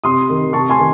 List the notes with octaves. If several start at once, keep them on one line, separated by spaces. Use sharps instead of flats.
C3 C6 D#6
D#3
C3 A5 C#6
G#5 C6
D#3